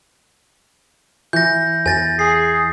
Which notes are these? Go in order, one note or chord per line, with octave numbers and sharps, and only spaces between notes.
E3 G6 A#6
E2 G#5 A6 A#6
G#4 C7